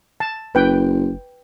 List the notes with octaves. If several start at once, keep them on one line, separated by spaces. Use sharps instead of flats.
A5
F#1 B4 G5